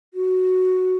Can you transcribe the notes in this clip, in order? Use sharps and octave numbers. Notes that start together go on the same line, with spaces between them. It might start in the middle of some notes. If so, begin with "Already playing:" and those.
F#4